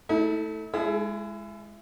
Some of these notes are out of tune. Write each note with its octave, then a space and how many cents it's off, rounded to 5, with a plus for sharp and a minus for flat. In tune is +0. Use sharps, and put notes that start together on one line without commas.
A3 +0 E4 -40
G#3 +0 E4 +30 A4 -40